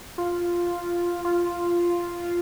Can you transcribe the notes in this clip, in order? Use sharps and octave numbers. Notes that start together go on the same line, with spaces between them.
F4
F4